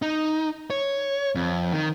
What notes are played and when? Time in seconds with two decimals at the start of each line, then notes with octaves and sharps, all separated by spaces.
0.02 D#4
0.70 C#5
1.35 F2
1.73 D#3